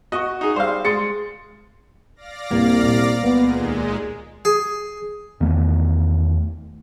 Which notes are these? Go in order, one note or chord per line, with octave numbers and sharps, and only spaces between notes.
F#4 D#5 C#6
D#4 G#4
G3 C5 F5
G#3 C6 A6 C#7
D5 F5 A#6
D1 C2 A#3
A#2 B3
C#2 A#2 G#3 B3
D#2
G#4
E2 D#3 A3